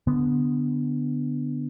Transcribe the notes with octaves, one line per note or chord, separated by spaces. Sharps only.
D3 B3